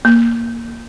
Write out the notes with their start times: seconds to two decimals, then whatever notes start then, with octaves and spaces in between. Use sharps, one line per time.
0.05 A#3